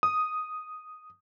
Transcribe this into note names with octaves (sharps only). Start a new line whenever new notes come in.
D#6